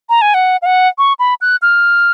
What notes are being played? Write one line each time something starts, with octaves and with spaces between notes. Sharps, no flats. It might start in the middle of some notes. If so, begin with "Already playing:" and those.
A#5
G#5
F#5
F5
F#5
C#6
B5
F#6
F6